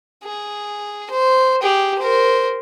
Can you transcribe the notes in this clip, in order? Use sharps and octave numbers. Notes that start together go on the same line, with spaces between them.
G#4
C5
G4 G#4
A#4 C5